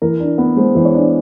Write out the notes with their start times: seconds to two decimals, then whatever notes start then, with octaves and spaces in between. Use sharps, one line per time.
0.02 E3 A#4
0.20 D4
0.38 B3
0.56 G#3 C5
0.75 E3 C5
0.85 C#5
0.95 D4